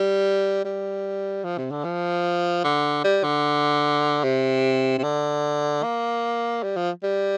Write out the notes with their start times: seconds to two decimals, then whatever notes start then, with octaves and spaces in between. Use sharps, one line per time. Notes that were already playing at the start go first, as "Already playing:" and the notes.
Already playing: G3
0.65 G3
1.44 F3
1.58 C3
1.71 D3
1.84 F3
2.64 D3
3.04 G3
3.24 D3
4.24 C3
4.98 C3
5.03 D3
5.83 A#3
6.63 G3
6.76 F3
7.03 G3